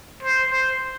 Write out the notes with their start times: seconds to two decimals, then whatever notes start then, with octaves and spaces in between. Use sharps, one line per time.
0.23 C5
0.52 C5